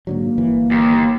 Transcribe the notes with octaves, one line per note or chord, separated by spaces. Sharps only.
G#2 D3 F#3 A#3
G1 E3
D#2